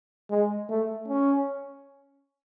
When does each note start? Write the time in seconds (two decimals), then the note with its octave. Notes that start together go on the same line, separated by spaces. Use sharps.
0.30 G#3
0.69 A3
1.08 C#4